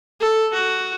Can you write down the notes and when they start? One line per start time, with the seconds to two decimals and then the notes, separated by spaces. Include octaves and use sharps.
0.20 A4
0.53 F#4